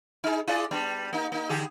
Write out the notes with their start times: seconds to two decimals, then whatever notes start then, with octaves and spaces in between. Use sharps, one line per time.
0.24 D#4 G#4
0.48 E4 G#4 D5
0.71 G3 B3 D4
1.13 A#3 D#4
1.32 A#3 D#4
1.49 D3 G4 G#4